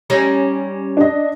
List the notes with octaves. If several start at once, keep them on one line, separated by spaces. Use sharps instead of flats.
G3 C#4 D#4
D4 D#5